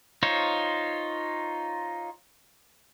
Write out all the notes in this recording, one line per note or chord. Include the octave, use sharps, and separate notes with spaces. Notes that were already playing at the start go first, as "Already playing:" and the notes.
D#4 F4 C5 C#5